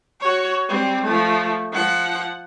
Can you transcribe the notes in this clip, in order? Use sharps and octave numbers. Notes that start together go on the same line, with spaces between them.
F#4 C#5
G3 C4
F3 A3
F3 F#5